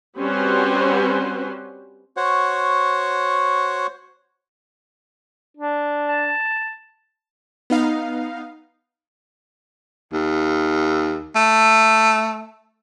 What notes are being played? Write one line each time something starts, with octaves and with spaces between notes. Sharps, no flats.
G3 C4 C#4 F#4 B4 C5
F#4 C5 C#5 F#5
D4
A5
B3 D#4 F5
D#2
A3